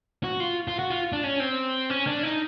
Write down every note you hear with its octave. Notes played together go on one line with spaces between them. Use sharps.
F#4
F4
F4
F#4
F4
D4
C#4
C4
C#4
D4
D#4